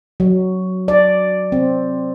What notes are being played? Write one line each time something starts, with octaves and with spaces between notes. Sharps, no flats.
F#3
D5
C4